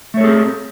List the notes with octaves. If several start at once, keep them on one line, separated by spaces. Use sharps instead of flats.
A3 C4 G#4 A4 C#5